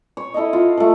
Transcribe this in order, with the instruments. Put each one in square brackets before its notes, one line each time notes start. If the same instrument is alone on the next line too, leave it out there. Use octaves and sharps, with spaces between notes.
[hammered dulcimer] C#5
E4 A4 C#5 D#5
F4
F3 A3